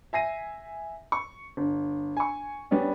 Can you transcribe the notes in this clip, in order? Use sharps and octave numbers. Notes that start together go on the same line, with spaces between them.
E5 G#5 A#6 C7 D#7
C#6
G1
G#5 C#6
G3 B3 C#4 D4